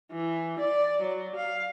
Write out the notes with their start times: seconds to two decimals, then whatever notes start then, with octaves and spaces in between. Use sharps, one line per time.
0.12 E3
0.59 D5
1.01 F#3
1.35 F5